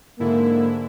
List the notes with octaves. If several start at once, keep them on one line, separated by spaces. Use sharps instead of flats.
G#2 D3 A#3 E4